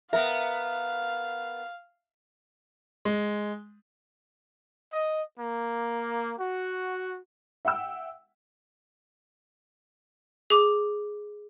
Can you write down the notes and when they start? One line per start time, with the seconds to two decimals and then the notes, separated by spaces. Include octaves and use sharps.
0.13 B3 A#4 E5 F5
3.05 G#3
4.93 D#5
5.40 A#3
6.39 F#4
7.65 E5 F#5 G5 E6
10.50 G#4 D6